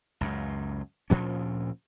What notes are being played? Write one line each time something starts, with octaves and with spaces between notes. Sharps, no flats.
C#2 F#2
D2 A#2 F3 C#4